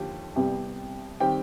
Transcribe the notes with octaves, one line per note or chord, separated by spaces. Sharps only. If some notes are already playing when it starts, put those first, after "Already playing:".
Already playing: D#2 D3 F3 G4
C2 C3 G3 B3 G4 G5
D#3 G3 C4 G4 G5